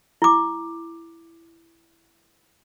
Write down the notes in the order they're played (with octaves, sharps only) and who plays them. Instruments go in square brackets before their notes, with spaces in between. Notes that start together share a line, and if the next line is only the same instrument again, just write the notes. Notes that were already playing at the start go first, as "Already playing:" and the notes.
[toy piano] E4 D6